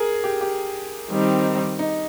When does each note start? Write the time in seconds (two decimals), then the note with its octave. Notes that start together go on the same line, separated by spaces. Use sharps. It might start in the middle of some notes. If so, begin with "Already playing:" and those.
Already playing: G#4 A#4
0.24 G4
0.41 G4
1.10 D#3 G3 C4 D#4
1.79 D#4